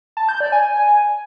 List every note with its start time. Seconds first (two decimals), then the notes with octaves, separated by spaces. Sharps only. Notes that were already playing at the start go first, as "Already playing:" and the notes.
0.17 A5
0.29 G6
0.40 D5
0.52 G#5